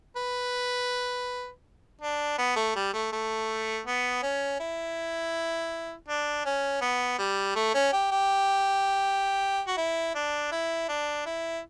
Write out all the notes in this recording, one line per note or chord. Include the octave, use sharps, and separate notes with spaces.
B4
D4
B3
A3
G3
A3
A3
B3
C#4
E4
D4
C#4
B3
G3
A3
C#4
G4
G4
F#4
E4
D4
E4
D4
E4